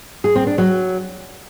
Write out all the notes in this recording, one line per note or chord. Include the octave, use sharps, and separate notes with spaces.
G#4
C4
D4
F#3